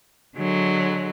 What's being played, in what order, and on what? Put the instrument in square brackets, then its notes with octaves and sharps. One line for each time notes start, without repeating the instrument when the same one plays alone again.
[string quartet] D3 F#3 G#3